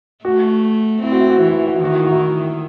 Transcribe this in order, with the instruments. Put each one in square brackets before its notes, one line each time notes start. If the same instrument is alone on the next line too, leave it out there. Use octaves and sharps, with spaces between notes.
[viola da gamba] A3 [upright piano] F#4
[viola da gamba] C4 [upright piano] E4
[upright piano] F#4
E4
F#4
[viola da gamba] E3 [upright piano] E4
[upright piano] F#4
E4
F#4
E4
[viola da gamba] D#3 [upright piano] F#4
[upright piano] E4
F#4
E4